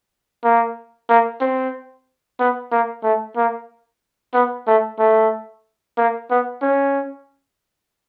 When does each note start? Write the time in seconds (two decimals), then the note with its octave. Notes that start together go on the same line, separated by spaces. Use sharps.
0.44 A#3
1.09 A#3
1.40 C4
2.39 B3
2.71 A#3
3.03 A3
3.36 A#3
4.33 B3
4.67 A3
4.99 A3
5.97 A#3
6.30 B3
6.62 C#4